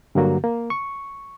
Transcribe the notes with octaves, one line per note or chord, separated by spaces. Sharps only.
G2 D3 F#3 A#3 F#4
A#3
C#6